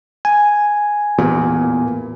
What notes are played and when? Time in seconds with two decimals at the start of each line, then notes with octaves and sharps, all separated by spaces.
0.25 G#5
1.18 A1 E2 A#2